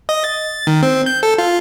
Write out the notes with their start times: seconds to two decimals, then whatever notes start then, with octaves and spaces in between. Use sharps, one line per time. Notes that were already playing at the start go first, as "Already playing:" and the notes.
0.09 D#5
0.24 A6
0.67 D#3
0.83 C4
1.06 G6
1.23 A4
1.38 F4